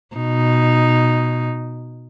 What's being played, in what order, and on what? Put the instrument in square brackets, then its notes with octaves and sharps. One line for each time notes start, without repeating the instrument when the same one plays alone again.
[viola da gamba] B2 D#4